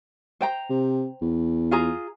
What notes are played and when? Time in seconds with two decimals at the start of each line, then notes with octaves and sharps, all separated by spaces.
0.41 C5 G5 A#5
0.70 C3
1.21 E2
1.71 F4 G#4 A#5